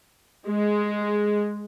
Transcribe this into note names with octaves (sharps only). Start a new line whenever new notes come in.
G#3